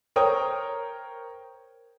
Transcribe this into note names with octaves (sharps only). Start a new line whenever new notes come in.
A#4 C5 C#5 G5 D#6